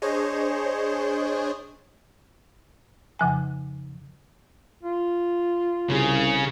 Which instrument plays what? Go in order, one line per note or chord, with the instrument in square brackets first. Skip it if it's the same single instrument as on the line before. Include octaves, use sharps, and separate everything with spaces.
[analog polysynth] D4 G#4 C5 C#5 D#5
[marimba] F2 C#3 F3 G#5
[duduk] F4
[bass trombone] C2 [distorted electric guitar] C#3